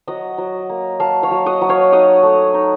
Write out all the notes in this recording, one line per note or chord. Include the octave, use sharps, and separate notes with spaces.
F#3 D#5 F#5
F#3
A#3
F#3 F5 A5
C#5 F5
F#3
D#5 F#5
F#3
C#5 F5
D#4 D#5 F#5
A3
D#4